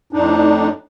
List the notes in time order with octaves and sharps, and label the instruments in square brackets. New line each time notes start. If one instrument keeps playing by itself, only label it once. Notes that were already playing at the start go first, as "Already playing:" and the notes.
[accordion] F2 A2 D4 D#4